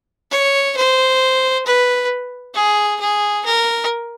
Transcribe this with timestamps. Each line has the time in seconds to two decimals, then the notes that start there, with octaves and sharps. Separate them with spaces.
0.31 C#5
0.77 C5
1.66 B4
2.55 G#4
3.00 G#4
3.45 A#4